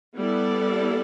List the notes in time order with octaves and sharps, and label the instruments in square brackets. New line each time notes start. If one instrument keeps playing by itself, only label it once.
[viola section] G3 B3 E4 A4 D5